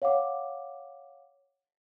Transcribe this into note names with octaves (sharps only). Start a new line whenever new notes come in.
C#5 F5 F#5 D6